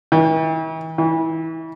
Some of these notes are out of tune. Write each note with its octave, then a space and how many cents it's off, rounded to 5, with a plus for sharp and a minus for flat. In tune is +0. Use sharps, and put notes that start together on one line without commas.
E3 -45
E3 -30